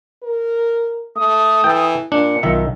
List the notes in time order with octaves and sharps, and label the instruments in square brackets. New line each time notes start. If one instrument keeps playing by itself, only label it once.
[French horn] A#4
[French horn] A3 [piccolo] D#6
[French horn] E3 [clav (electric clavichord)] A4 G5
[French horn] A#2 [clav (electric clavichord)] D4 [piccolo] C#7
[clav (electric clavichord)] B1 D#3 E5 [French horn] F4